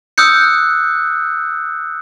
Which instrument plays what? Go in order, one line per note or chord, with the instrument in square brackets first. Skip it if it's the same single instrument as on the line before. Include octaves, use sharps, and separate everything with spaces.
[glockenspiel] D#6 E6 F#6 G6 C#7